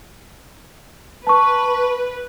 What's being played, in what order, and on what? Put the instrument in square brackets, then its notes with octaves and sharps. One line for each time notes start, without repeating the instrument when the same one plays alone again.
[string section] B4 [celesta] A5 C#6